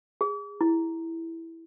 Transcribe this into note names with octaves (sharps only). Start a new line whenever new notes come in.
G#4
E4